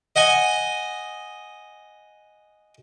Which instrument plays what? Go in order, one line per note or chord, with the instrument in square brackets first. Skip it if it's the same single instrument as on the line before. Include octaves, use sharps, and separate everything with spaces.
[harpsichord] D#5 F#5 G#5